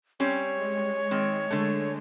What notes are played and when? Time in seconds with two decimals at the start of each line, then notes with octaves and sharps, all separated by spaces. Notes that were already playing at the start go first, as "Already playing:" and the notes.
0.20 G3 C4 C#4 C#5
0.55 G#3
1.11 D#3 C4
1.51 D3 A3